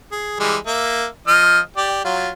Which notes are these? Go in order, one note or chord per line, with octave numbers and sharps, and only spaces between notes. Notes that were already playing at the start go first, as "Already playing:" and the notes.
G#4
E3 G3 G#3
A#3 E5
F3 D#5 F6
G4 D5
F#3 F4